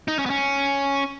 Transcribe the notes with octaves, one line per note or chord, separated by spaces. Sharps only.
D#4
C#4
B3
C#4